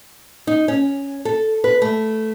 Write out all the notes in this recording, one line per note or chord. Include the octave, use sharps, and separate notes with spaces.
D#4
C#4
A4
B4
A3